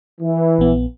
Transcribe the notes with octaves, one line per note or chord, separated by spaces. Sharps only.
E3
A#1 B3